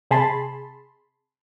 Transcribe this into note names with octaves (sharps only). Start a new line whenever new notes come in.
C3 G#4 A5 B5 C6